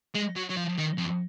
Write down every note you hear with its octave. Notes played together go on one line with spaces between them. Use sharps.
G#3
F#3
F#3
F3
D#3
F2